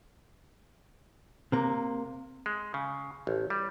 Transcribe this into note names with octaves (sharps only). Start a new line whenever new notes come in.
C3 A#3
G#3
C#3
A1
G3